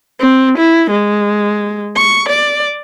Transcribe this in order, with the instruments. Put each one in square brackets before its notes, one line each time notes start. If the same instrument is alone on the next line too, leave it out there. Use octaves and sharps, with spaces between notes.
[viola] C4
E4
G#3
C#6
D5